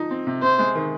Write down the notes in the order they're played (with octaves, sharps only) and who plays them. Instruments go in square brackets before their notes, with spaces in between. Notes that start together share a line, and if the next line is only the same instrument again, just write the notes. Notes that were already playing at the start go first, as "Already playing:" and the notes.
Already playing: [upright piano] F3 D#4
C4
C3
[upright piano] C3 [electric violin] C5
[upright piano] G#3
D#3